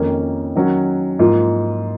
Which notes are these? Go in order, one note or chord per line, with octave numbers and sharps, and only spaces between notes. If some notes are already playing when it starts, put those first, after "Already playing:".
Already playing: F2 D#3 A#3 C#4
D#3 F#3 C#4 F#4
G#2 F3 A#3 F4